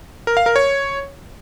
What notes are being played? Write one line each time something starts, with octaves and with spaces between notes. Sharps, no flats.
A#4
F5
A#4
C#5